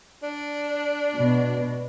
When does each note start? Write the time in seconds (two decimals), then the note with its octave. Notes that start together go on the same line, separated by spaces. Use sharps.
0.23 D4
1.15 B2